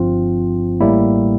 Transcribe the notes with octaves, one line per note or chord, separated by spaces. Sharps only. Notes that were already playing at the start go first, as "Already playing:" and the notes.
Already playing: G1 G2 F3 C4 F4
A1 A2 G3 A#3 E4